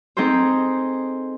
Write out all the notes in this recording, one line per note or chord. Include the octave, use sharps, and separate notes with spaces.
C4 D#4 G#4 A4 C5